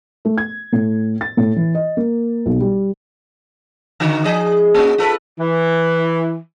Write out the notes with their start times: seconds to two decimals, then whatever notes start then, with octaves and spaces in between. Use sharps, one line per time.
0.25 A3
0.38 G#6
0.73 A2
1.21 A6
1.37 A2
1.56 E3
1.75 D#5
1.97 A#3
2.46 B1
2.60 G3
4.00 D3 D#3 F#4
4.25 F3 G#4 D#5
4.75 A#3 C#4 F#4
4.98 F4 A4 B4
5.40 E3